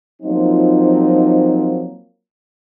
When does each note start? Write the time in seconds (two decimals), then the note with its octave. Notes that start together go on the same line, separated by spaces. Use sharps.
0.22 F3 F#3 A#3 C4 D#4 F4